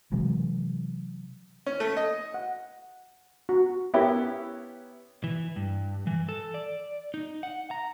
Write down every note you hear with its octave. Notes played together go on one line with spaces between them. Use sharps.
C3 E3 F#3 G#3
C#4
A3
D#5
F#5
F#4
B3 C#4 E4 G4 A#4
E3
G2
E3
A4
D5
D#4
F#5
A#5